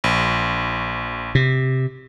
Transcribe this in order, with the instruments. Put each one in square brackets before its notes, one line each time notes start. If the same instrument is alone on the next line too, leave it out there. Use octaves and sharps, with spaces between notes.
[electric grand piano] A#1
[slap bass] C3